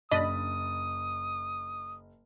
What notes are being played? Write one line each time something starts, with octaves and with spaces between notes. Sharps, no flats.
F#1 D4 D#5 B5 D#6 A6